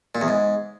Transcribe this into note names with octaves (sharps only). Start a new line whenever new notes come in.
A#2
E2
G#2